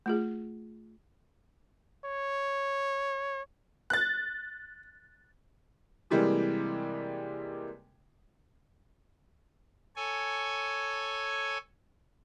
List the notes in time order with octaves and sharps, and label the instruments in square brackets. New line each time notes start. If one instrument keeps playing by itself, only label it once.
[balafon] A3 F4 G#4
[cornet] C#5
[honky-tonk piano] F#6 A6
[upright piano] C3 E3 G3 G#3 A#3
[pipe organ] A4 C#5 G#5